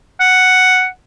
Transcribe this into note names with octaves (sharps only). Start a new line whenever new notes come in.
F#5